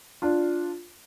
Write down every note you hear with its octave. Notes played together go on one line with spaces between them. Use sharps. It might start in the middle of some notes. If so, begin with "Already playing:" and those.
D4 F4